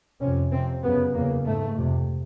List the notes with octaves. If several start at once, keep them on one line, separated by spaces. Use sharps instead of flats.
F2 C3 C#4
F2 C3 C4
F#2 C#3 B3
E2 C#3 A#3
G#2 A3
F2 C3